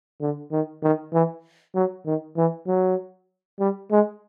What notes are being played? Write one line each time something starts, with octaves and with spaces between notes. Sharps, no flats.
D3
D#3
D#3
E3
F#3
D#3
E3
F#3
G3
G#3